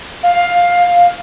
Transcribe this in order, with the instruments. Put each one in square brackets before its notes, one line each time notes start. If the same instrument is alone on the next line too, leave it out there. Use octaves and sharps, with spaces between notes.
[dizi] F5